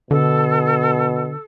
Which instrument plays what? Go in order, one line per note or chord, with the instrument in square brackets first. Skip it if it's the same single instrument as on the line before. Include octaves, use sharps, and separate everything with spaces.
[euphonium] B2 [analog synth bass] D3 [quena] A4